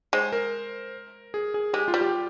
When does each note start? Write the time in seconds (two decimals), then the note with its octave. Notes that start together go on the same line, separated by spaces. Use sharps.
0.13 G#3 C5
0.32 A#4
1.34 G#4
1.54 G#4
1.73 G#3 G4
1.88 F4
1.94 G3
2.01 G4